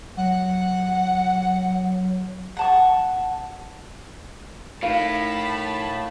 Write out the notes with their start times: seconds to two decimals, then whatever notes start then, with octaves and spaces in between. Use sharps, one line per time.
0.17 F#3 F#5
2.57 F#5 A5 C#6
4.82 A2 D#4 F4 A#4 F5 A5 B5